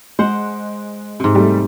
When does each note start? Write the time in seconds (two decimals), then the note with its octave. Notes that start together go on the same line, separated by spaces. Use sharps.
0.19 G#3 C5 F#5
1.20 G#2 C3
1.35 G3 A3